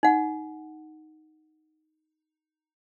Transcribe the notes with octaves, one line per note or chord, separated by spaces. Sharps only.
D#4 F#5